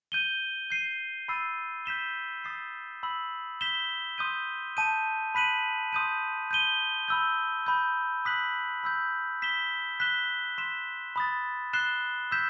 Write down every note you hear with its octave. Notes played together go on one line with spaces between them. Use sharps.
G6 D#7 G7
G6 C7 D#7
B5 E6 A6 C7 D#7
G6 B6 E7 G7
D#6 A6 C7
B5 E6 B6 F#7
G6 B6 E7 G7
C6 D#6 G6 D#7
A5 D#6 G6 D#7
B5 F#6 B6 D#7 F#7
C6 D#6 G6 D#7
G6 D#7 G7
B5 E6 G6
B5 D#6 G6
D#6 F#6 B6 F#7
B5 E6 G6
E6 B6 E7 G7
F#6 B6 E7 G7
C6 E6 B6 E7
B5 D#6 A6
F#6 A6 C7 E7 G7
E6 G6 B6 E7